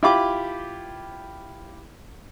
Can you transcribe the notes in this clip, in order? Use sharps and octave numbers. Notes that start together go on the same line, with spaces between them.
E4 F4 G4 B5 D6